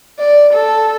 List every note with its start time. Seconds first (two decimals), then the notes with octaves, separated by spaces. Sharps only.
0.19 D5
0.53 A4